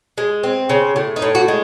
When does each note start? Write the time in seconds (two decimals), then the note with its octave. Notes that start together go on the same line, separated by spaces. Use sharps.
0.18 G#3
0.43 C4
0.69 C#3
0.96 A2
1.16 D#4
1.22 A2
1.35 F#4
1.48 G#3